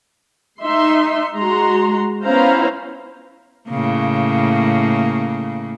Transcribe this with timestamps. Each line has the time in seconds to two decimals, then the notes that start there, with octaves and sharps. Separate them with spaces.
0.62 D#4 E5 C6
1.37 G#3 F#4 A#5 C6
2.24 B3 C#4 E4 C5 F5 A#5
3.68 A2 C#3 A#3